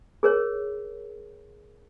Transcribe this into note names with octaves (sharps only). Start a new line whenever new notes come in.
G#4 A#4 C#5